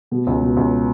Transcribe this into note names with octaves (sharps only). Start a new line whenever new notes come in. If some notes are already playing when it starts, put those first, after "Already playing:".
B2
C#2
B2
C#2